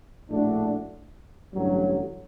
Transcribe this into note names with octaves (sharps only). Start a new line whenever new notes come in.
A#1 A2 A3 D4 F#4
A1 G2 D3 F#3